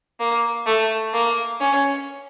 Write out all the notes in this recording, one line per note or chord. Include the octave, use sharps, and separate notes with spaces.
A#3
A3
A#3
C#4